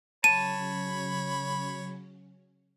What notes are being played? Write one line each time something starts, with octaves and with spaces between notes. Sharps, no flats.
C#3 F#3 C#4 C#5 A5 B5 D#7